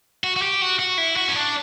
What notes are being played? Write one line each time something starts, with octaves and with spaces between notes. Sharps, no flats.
F#4
F#4
G4
F#4
F#4
E4
F#4
C#4
D4